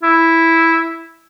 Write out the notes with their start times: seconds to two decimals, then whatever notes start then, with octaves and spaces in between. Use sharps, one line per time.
0.03 E4